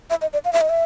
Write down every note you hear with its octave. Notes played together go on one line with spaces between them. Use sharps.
E5
D#5
D5
F5
E5
D#5
E5